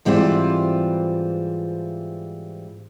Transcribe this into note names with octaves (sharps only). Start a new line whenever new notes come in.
G#2 E3 G3 C4 F4 C5